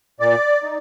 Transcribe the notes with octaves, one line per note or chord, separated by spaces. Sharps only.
A#2 D5
D#4